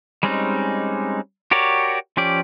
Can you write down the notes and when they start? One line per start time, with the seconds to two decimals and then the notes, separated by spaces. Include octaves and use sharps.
0.23 G3 G#3 C4 C#4 D#4
1.51 F#4 G4 A#4 C#5 D5
2.17 F3 C#4 G4 D5